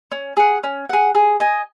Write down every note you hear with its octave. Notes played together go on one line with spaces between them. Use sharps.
C#4
G#4 F#5
C#4
G#4 F#5
G#4
D#5 G#5